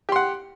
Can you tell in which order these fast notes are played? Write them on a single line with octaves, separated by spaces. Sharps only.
G4 C6 F#5